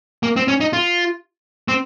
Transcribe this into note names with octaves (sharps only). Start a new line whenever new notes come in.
A#3
C4
C#4
D#4
F4
C4